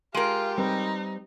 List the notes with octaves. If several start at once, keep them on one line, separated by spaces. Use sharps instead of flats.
G#3 F4 G4 A#4
G3 C4 D#4 B4